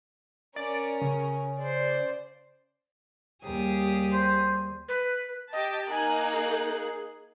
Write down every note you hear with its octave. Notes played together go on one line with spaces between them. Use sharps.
C#4 A#4 D5
C#3
C5 D5
D#2 G3 G4 G#4
C5
B4
G4 D#5 A5
A#3 D#4 G#5 F#6
G#4